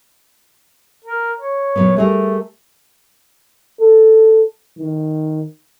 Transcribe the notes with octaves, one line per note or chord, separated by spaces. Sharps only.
A#4
C#5
A#2 F#3 B3
G3 A3 G#4 A#4
A4
D#3